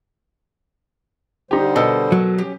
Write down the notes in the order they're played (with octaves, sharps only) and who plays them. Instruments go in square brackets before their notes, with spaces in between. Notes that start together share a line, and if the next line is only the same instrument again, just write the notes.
[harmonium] D3 G3 C5 [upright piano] D#4 G4
[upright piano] B2 [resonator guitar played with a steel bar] A4 A#4 D#5
[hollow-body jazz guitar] F#3
[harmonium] C#4 [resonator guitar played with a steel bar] G4